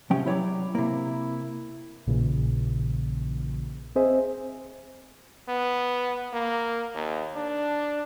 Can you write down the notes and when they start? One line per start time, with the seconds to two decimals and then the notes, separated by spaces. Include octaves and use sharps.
0.11 C3 F3 C#4 G5
0.26 F#3 E4 C#5 D5
0.75 C3 A#3 E4
2.07 A#1 A#2 C#3 E3
3.96 C4 G#4 C5 D#5 E5 G#5
5.48 B3
6.33 A#3
6.95 D#2
7.35 D4